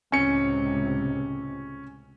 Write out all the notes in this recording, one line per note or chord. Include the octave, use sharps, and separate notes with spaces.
C#2 A2 C3 C#4 C#7